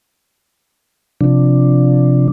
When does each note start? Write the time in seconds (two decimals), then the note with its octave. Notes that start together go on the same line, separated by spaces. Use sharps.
1.21 C3 F3 D4